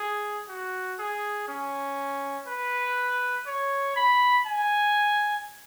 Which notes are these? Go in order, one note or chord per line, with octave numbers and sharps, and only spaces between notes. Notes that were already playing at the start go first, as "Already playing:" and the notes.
Already playing: G#4
F#4
G#4
C#4
B4
C#5
B5
G#5